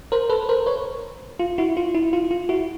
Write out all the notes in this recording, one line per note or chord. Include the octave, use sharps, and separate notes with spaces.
A#4 C5
A4 B4
A#4 C5
B4 C#5
F4
E4 F#4
F4
E4
F4
F4
E4 F#4